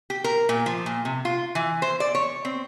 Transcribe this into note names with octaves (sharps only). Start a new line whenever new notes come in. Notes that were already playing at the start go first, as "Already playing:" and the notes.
G4
A#4
A#2
F3
A#2
C3
F4
E3
C5
D5
C#5
C4